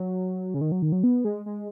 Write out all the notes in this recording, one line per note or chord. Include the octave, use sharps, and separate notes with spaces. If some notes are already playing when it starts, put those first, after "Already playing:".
Already playing: F#3
C#3
D#3
F#3
D#3
F#3
B3
G#3
G#3